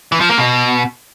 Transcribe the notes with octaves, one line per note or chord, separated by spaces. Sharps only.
E3
F3
A#3
B2